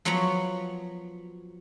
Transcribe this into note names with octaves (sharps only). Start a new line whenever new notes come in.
F3 F#3 B3 C#5 A#5 B5